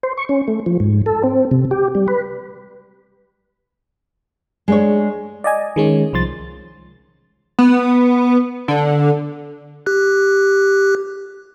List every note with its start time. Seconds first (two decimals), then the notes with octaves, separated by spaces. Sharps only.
0.03 C5
0.18 C#6
0.29 C#4
0.48 A3
0.66 F3
0.80 G#2
1.06 A4
1.24 C4
1.51 C3
1.71 G4
1.95 G3
2.08 B4
4.68 G#3 D4 C#5
5.44 D5 D#5 G#5
5.76 D#3 G#3 C#4
6.13 C2 F3 C6 A6
7.59 B3
8.68 D3
9.86 G4 F#6